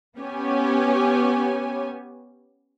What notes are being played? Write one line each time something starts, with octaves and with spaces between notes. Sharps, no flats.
B3 C#4 G4 C#5 G#5